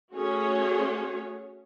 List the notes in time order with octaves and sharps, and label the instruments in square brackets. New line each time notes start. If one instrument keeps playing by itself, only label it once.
[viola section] A3 C#4 F#4 G#4 C#5